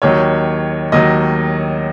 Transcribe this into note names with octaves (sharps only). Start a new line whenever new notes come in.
D#2 D#3 F#3 C#5
D#2 D#3 F#3 D#5